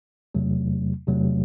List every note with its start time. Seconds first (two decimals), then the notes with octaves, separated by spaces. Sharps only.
0.34 E2 C3 F#3 A3
1.07 E2 C3 F#3 A3